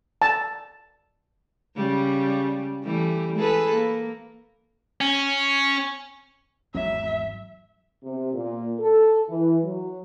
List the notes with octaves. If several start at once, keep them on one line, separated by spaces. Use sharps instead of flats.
A5
C#3 G3
E3 G3 A3
G#4 A4 B4
A#3
C#4
G#1 E2 G#2 F#3 E5
C3
A#2
A4
E3
F#3